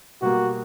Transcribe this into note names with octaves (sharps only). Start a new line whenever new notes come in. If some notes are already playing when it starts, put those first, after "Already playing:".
B2 G3 A#3 F#4